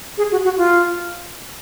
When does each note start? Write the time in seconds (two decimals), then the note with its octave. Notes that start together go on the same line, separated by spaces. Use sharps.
0.18 G#4
0.31 F#4
0.44 F#4
0.57 F4